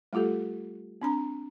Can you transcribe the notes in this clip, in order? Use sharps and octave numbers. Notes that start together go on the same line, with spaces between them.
G3 A3 F4 G4 A4
C4 D4 A#5